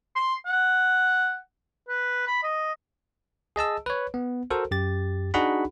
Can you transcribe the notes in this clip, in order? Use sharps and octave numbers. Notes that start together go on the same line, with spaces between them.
C6
F#5
B4
B5
D#5
G#4 D#5 A5 E6
B4 C#5
B3
F#4 A4 A#4 C5
F#2 G4 A6
D4 D#4 F#4 G#4 F#5 B5